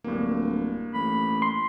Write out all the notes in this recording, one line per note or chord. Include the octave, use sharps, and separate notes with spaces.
D1 G2 A#3
A1 B5
C6